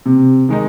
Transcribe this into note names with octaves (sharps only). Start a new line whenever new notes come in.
C3
D#3 G#3 D#4